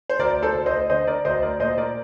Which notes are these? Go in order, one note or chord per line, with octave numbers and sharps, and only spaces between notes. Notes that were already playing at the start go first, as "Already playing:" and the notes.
C5
D2 A#4 D5
A4 C5
D2
C5 D#5
D3 C5 D#5
A#4 D5
D2 C5 D#5
A#4 D5
A#2 C5 D#5
A#4 D5